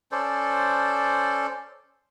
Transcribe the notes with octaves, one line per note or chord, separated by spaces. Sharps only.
C#4 A4 C5 D5